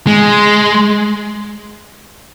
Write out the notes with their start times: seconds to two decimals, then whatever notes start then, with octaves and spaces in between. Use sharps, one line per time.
0.07 G#3